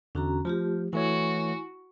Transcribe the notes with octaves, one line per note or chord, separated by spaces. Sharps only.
E2 D3 C#4 F#4 A#5
F3 A3 F4 G4
E3 A3 E4 F#4 C#5 G#5